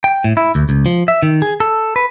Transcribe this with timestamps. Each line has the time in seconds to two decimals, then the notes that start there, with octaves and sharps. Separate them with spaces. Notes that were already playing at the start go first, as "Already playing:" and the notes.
0.04 G5
0.24 A2
0.37 E4
0.55 D2
0.69 C#2
0.86 F3
1.08 E5
1.23 D#3
1.42 G#4
1.60 A4
1.96 B4